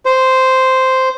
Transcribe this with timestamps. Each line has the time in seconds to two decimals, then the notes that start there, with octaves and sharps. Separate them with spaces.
0.06 C5